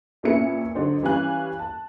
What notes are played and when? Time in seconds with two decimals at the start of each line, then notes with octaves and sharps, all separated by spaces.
0.23 A#1 A#2 B3 C#4 E4 C#7
0.75 D3 F#3 D4 D#4 F#4 C5
1.03 E3 G3 C#4 F5 G#5 F#6
1.59 A5